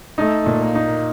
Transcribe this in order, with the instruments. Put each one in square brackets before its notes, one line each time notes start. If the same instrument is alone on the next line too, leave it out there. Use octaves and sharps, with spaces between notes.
[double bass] A3 [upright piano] D#4
[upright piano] A#2
[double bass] A#3
[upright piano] D#4